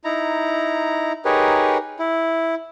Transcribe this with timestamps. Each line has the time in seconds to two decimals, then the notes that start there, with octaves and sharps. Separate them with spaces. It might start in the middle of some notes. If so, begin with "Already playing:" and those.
0.04 D#4 E4 A#5
1.25 D#4 G4 G#4 A#4 B4 C#5
1.99 E4